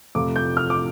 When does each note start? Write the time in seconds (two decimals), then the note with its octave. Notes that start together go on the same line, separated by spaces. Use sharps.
0.15 F2 C3 F3 A3 D6
0.36 G6
0.57 F6
0.70 D6